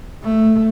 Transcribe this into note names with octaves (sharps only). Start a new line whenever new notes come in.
A3